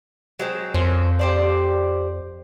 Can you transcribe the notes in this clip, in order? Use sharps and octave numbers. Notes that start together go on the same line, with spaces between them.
F#3 G#3 C4
F2 C#4 A#4 C5
G4 C5 D5